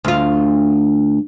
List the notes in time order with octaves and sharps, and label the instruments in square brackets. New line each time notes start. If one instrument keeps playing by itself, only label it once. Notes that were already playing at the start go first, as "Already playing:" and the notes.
[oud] D2 F4